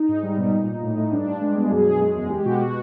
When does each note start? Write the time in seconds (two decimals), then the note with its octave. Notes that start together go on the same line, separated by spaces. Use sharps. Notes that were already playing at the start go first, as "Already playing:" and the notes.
Already playing: D#4
0.08 G#2
0.23 G3
0.37 B2
0.53 A#2
0.68 A#2
0.83 A2
0.97 A2
1.12 G2 D4
1.27 G2
1.41 G#3
1.57 B2
1.71 F#2 G#4
1.86 F#2
2.01 G#3
2.16 E2
2.31 G#3 G4
2.45 B2 F#4
2.60 F#4